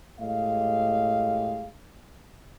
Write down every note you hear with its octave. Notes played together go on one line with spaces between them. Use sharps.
A2 G#3 G4 D#5 F5